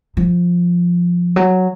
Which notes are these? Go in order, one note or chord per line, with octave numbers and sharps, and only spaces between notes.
F3
F#3